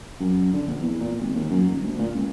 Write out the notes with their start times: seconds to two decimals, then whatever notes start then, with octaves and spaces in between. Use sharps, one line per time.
0.20 F#2
0.53 D3
0.68 A#1
0.81 E2
1.00 A#2
1.20 G#1
1.34 D#2
1.50 F#2
1.69 D#1
1.84 D2
1.98 A#2
2.15 C#2